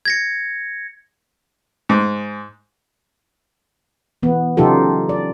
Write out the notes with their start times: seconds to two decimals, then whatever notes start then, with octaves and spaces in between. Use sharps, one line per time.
0.05 G#6 A#6 C#7
1.89 G#2
4.23 E3 B3
4.57 C#3 F#3 D#4 F4 G4 A4
5.09 D5